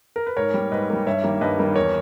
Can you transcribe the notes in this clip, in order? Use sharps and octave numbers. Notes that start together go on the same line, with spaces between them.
A#4
B4
G#2 A#4 C#5
G3 A#3
G#2 B4 D#5
G3 A#3
G2 C#5 E5
D#3 G3 A#3
G2 B4 D#5
D#3 G3 A#3
E2 A#4 C#5